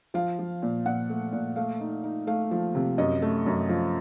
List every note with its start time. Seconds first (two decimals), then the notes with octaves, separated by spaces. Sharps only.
0.14 F3 F5
0.39 F3
0.62 A#2
0.86 A#2 F#5
1.10 A3
1.33 A#2
1.56 A3 F5
1.80 D#4
2.04 D#4
2.27 A3 F5
2.51 F3
2.75 C3
2.98 F#2 D#5
3.22 A3
3.46 F#2
3.69 F3